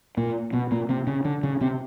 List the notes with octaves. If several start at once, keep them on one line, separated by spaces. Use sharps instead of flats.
A#2 A#3
B2 B3
A#2 A#3
C3 C4
C#3 C#4
D3 D4
C#3 C#4
C3 C4